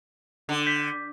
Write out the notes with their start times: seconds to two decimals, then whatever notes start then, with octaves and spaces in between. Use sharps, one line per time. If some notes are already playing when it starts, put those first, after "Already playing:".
0.49 D3
0.66 G6 B6